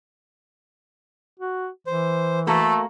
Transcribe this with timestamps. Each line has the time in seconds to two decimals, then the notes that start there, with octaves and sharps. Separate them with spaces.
1.40 F#4
1.87 E3 C5
2.47 A3 A#3 F#4 A4 B5